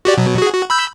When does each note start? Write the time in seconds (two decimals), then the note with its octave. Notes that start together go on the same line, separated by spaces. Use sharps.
0.05 F#4 G4 D5
0.18 B2 F#3
0.38 F#4 G#4
0.54 F#4
0.70 B5 E6 G6